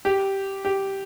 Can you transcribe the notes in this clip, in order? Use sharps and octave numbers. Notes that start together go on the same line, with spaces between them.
G4
G4